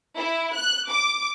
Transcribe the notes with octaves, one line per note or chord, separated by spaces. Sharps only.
E4
F#6
D6